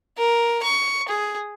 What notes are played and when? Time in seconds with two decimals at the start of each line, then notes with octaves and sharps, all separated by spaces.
0.17 A#4
0.63 C#6
1.08 G#4